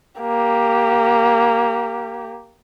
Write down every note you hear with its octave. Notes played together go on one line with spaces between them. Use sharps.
A#3 G4